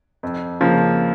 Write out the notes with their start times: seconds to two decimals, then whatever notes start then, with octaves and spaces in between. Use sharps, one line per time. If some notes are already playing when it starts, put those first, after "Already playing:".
0.23 F2
0.60 C#3 F3 A#3